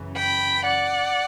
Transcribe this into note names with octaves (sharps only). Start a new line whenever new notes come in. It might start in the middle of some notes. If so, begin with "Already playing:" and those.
Already playing: F#2 C#3 E3
G5 B5
D5 F#5